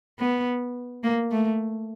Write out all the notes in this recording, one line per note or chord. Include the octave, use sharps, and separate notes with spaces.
B3
A#3
A3